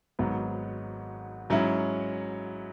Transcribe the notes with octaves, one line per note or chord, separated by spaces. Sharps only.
G#1 G#2 F#3 B3
G#2 F#3 C#4 E4